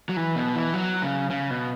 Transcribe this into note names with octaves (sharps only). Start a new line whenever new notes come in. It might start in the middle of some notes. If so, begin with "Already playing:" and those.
F#3
E3
B2
E3
F#3
C#3
C#3
B2